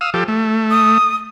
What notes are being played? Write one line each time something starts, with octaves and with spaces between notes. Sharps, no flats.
F5 D#6 E6
F3 G4 A4
A3
D#6